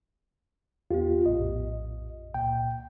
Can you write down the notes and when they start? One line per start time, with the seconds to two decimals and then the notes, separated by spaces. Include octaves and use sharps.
0.91 E2 B3 F4 G4
1.26 A#1 F2 A2 D#5
2.34 C#2 A#2 G5